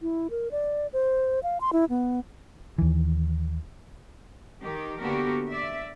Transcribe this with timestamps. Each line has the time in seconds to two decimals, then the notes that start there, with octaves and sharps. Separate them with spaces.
0.01 E4
0.30 A#4
0.51 D5
0.93 C5
1.43 F5
1.61 C6
1.73 E4
1.90 B3
2.78 D#2 E3
4.61 D#3 G4
4.99 D3 A#3 B3 F#4 G4 A#4
5.50 D5 E5